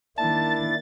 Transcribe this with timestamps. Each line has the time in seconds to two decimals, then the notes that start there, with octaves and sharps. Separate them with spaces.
0.18 D#3 A#3 D4 E4 A5 A6